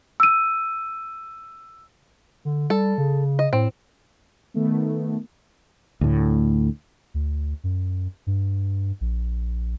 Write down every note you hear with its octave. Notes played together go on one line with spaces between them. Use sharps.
E6 D#7
D3
G3 A4
C#3
D#5
A2 C4
D#3 A3 B3
D2 A2
D2
F#2
G2
A#1